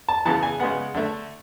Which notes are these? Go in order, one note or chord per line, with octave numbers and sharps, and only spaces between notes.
A5
C#3 E3 B3 A5
G#5
C#3 G#3 B3 F#5
D3 A3